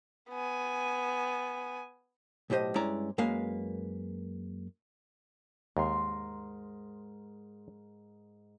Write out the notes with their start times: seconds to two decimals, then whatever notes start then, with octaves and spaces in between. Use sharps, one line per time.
0.30 B3 G#5
2.50 B1 A2 G4 C5 D#5
2.75 G2 G#3 C#4 E4 D5 A#5
3.18 F#2 G#3 A#3 B4 F5
5.77 D#2 G#2 A#4 C6